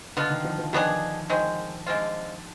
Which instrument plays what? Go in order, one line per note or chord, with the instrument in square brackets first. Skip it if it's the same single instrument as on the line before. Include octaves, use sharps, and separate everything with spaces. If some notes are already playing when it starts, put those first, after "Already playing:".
[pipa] B2 B3 F4 [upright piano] D3
[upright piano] D#3
F3
F3
[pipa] D#3 B3 D4 G#4 [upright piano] F3
[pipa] D#3 G#3 C4
D3 G#3 C4 F4